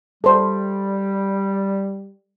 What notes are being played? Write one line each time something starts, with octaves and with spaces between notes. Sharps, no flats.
G3 A4 C5